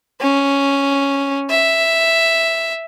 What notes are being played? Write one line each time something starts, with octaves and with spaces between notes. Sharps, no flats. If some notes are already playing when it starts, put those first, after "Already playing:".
C#4
E5